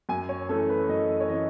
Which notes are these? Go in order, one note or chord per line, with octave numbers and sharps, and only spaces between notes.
F#2 G#5
C#5
E3 A3 C#4 A4
B4
F#2 D#5
C#5
E3 A3 C#4 D#5